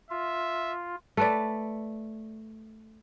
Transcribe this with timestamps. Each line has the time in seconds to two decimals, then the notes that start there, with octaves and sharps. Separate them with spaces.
0.11 F4 E5
1.17 A3 B4 D5